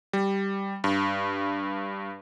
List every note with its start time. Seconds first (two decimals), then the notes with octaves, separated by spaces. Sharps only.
0.13 G3
0.84 G2